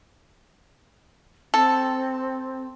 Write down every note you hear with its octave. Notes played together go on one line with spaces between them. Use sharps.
C4 A4